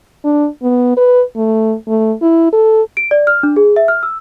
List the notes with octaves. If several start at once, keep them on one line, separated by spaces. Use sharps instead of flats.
D4
B3
B4
A3
A3
E4
A4
D7
D5
F6
D4
G#4
E5
F6
E6